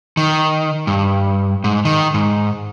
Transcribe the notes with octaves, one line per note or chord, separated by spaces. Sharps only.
D#3
G2
G#2
D#3
G#2